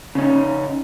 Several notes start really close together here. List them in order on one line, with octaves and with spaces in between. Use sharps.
C#3 C#4 D#4